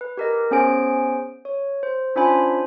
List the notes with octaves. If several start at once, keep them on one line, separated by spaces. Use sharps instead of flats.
B4
G4 A#4 D#5
B3 C#4 G#4 C5 G#5 D7
C#5
C5
C#4 D4 F4 C5 G#5 B5